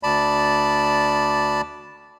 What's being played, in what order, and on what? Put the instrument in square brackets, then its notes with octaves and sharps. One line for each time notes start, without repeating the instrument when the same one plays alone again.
[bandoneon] D2 D5 A5 B5